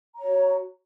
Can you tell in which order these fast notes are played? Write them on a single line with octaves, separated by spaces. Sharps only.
A#5 C#5 F#4